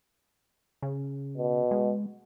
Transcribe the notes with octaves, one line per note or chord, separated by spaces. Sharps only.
C#3
B2
G#3